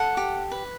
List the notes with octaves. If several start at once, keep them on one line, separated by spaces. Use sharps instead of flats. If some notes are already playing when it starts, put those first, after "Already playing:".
Already playing: A4 F#5
G4
B4